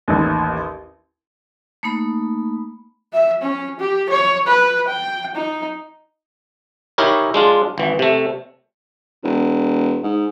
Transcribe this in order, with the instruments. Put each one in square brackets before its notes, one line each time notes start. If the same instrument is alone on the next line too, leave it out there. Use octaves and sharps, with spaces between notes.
[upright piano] A1 D#2
[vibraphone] A3 A#3 D#4 B5
[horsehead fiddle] E5
C#4
G4
C#5
B4
G5
D#4
[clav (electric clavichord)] D#4 E4 G4 A#4 C#5
G#3 D4 F4
G#1 E3
C3 A3
[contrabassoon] E1
G#2